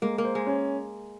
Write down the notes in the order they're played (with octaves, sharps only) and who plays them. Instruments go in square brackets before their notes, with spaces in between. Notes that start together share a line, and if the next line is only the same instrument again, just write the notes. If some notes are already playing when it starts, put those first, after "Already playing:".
[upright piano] G#3 [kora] A#3
[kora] A#3
[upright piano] C5
[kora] G#3
[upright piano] C#4